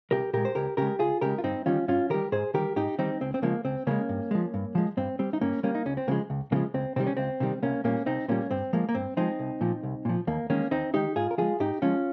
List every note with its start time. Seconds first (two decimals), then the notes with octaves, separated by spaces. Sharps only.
0.11 C2 G4 A#4
0.33 A#2 G#3 G4 A#4
0.45 C5
0.55 C#2 G4 A#4
0.77 C#3 G#3 G4 A#4
0.99 C#2 F4 G#4
1.21 C#3 G#3 G4 A#4
1.38 F4
1.43 G2 C4 D#4
1.66 D#3 G3 C#4 F4
1.88 G2 C#4 F4
2.10 D#3 G3 G4 A#4
2.32 G#2 G#4 C5
2.54 D#3 G3 G4 A#4
2.76 G#2 D#4 G4
2.98 D#3 G3 C4 D#4
3.21 C#2 C4
3.34 C4
3.42 C#3 F3 G#3 A#3
3.65 C#2 C4
3.87 C#3 F3 G#3 A#3 C#4
4.09 G2
4.31 F3 G#3
4.54 G2
4.75 F3 G#3
4.97 G2 C4
5.19 G3 C4
5.33 D#4
5.41 G2 A#3 C#4
5.63 G3 A#3 C#4
5.75 D#4
5.85 C#2 C#4
5.97 C4
6.08 C#3 F3 G#3 A#3
6.30 C#2
6.52 C#3 F3 G#3 A#3
6.74 C#2 C4
6.96 C3 D#3 G3 C4
7.07 C#4
7.17 C#2 C4
7.40 C3 D#3 G3
7.63 C2 A#3 C#4
7.84 A#2 G3 A#3 C#4
8.06 C2 C4 D#4
8.28 A#2 G3 A#3 C#4
8.51 G2 C4
8.73 F3 G#3 A#3
8.89 A#3
8.95 G2 C4
9.17 F3 G#3 C4 D#4
9.39 C2
9.61 A#2 F3
9.83 C2
10.05 A#2 F3
10.27 D#2 A#3
10.50 D#3 G#3 A#3 C#4
10.71 D#2 C4 D#4
10.94 D#3 G#3 D#4 G4
11.16 G#2 F4 G#4
11.31 A#4
11.38 F3 G#3 F4 G#4
11.60 G#2 D#4 G4
11.82 F3 G#3 C#4 F4